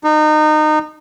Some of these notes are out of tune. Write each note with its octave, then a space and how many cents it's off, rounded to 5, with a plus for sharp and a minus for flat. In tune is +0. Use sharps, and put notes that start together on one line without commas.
D#4 -25